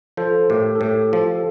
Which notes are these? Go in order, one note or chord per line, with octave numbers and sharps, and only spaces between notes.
F3 A4 C5
A2 G4 A#4
A4
A2 G4
F3 G4
A4